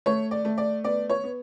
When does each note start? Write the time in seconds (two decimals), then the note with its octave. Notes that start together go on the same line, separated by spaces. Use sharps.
0.06 A3 C#5
0.31 D5
0.45 A3
0.58 D5
0.84 B3 D5
1.10 C#5
1.24 B3